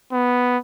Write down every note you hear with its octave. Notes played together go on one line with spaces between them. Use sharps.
B3